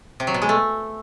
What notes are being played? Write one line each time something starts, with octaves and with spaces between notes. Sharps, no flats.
C3
F#3
B2
G#3
A3